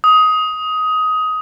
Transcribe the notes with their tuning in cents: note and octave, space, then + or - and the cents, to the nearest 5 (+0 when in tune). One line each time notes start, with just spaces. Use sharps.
D#6 +15